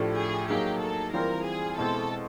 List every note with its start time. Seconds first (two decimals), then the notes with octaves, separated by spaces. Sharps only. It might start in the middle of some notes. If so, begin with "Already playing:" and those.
Already playing: A2 F3 A3 D4 G4
0.17 G#4
0.50 F#3 A#3 D#4 G4 G#4
0.81 A4
1.14 E3 G3 C4 F4 A#4
1.47 G#4
1.78 B2 G#3 C4 E4 A4